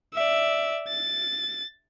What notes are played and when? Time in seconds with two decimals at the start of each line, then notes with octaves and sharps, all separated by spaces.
0.13 D5 E5
0.88 A6